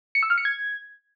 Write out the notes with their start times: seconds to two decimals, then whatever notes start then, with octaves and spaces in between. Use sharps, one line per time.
0.15 C#7
0.23 E6
0.30 F6
0.38 C#7
0.45 G#6